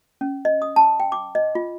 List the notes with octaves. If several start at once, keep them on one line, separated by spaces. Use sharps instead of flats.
C#4
D#5
D#6
A5
G5
D6
D#5
F4